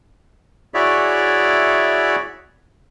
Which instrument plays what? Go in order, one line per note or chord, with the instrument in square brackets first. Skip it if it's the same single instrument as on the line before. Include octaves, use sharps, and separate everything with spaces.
[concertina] E4 F#4 G#4 C#5 D5 E5